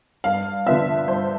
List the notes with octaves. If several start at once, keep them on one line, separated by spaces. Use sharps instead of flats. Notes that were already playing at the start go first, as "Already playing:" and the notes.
G2 F5
D3 F3 B3 E5
G2 C5